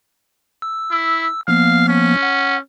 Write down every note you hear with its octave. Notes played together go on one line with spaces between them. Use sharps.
E6
E4
F3 A#3 B3 F5
C#4
F#5